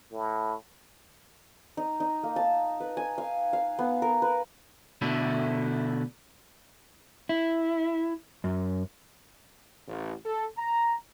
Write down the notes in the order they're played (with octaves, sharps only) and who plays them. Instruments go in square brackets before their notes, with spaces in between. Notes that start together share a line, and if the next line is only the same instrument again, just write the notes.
[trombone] A2
[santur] D#4
D#4
A#3
A5
B4
G#5
F5
F5
B3
A#4
B4
[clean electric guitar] B2 D3 A3 E4
[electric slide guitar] E4
F#2
[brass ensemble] A1
A4
A#5